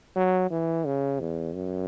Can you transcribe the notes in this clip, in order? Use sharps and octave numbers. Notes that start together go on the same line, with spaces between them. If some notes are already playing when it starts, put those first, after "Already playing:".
F#3
E3
C#3
E2
F#2